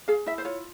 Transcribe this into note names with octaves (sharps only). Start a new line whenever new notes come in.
G#4 F5
E4 E5
C5
F4 C#5